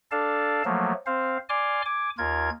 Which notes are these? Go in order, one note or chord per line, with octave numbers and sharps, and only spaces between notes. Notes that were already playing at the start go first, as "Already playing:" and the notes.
D4 A4 D5 F5 A5
F3 F#3 A3 A#3
C4 C5 F5
D5 G#5 C6 D6 F6
G#5 D6
D#2 F4 A#4 G#6